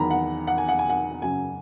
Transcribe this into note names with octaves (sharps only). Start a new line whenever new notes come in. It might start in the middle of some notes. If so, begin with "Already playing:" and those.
Already playing: E2 D#3 F#3 A#5 B5
F#5
F#5
G#5
F#5
G#5
F#5
F#2 C#3 F#3 G#5